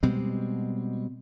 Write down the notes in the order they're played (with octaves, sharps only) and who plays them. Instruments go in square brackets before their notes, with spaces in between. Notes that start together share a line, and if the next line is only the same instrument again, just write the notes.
[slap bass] B2 G3 G#3 C4